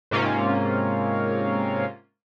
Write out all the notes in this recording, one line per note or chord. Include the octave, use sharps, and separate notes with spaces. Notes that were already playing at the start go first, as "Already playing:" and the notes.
G#2 C3 A#3 C#4 F4